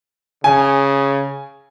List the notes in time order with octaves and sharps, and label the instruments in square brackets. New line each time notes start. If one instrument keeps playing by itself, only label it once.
[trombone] C#3 [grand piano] G#5